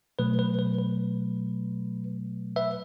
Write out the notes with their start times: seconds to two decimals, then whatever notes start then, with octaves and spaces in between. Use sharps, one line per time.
0.19 B2 F#3 A3 B4
0.39 B4
0.59 B4
0.78 B4
2.56 B4 E5